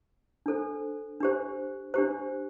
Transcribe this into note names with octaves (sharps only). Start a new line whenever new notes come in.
D4 A4 C5
D4 G4 C5
D4 G4 C5